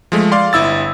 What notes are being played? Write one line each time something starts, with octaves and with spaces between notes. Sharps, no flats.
F3 G#3 A3
D5 F5 C6
G1 E4 E6 A6